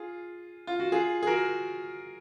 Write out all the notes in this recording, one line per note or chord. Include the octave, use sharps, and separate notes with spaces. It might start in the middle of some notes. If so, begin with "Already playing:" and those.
Already playing: F4 G#4
F4
F#4
F4 G#4
G#4
F#4 A#4